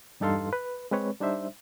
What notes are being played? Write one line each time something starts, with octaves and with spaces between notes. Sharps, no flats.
E2 G2 D#4 A4 F5 C6
B4
G#3 C4 B4 C#5
G3 D4 D#4 C5 E5